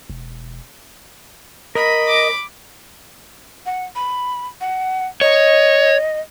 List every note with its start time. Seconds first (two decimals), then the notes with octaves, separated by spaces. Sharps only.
0.10 E1
1.75 A#4 D#5 B5
2.09 D6
3.66 F#5
3.95 B5
4.61 F#5
5.21 C#5 D#5